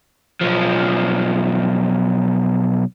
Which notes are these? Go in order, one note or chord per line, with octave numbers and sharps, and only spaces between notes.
B1 F3